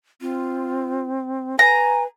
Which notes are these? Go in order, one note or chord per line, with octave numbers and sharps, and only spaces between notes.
C4 F4
B4 G#5 A#5